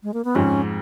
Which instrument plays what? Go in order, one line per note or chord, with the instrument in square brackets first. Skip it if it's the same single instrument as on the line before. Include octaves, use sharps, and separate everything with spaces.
[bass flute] G#3
A#3
B3
[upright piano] F2 G#2 [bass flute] C#4